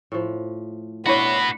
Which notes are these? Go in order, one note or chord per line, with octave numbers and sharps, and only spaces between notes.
A2 F3
D4 E4 F#4 B4 C#5 B5